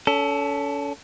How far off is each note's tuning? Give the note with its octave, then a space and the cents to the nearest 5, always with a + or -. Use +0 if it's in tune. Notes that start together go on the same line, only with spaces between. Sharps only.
C#4 +35 A4 +0